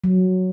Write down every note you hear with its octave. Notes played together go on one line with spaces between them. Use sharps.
F#3